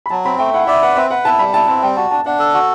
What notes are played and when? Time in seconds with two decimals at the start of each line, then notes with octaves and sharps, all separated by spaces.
0.06 B5
0.10 F#3 A5
0.25 C4 B5
0.39 A3 G5
0.53 E4 F#5
0.67 D5 E5
0.82 B4 F#5
0.96 C4 E5
1.10 B4 F#5
1.25 E4 A5
1.39 G3 B5
1.54 E4 A5
1.68 C4 A5
1.83 G3 G5
1.97 F#4 A5
2.11 D4 A5
2.25 D4 F#5
2.39 A4
2.54 F#4